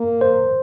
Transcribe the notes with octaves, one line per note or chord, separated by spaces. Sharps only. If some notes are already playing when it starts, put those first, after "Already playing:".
Already playing: A#3
C5